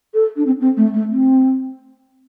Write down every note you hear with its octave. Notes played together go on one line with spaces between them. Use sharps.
A4
D4
C4
C4
A3
A3
C4